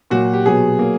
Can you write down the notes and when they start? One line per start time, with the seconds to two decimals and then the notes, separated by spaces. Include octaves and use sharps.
0.11 A#2 F#3 A#3 F#4
0.33 G4
0.46 B2 F#3 B3 G#4
0.79 F#3 A#3